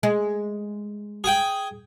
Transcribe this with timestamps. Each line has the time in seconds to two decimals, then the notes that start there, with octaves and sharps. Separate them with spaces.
0.03 G#3
1.24 G#4 G5